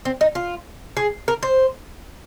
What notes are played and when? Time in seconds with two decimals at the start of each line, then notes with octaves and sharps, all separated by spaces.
0.05 C4
0.21 D#4
0.35 F4
0.97 G#4
1.28 A#4
1.43 C5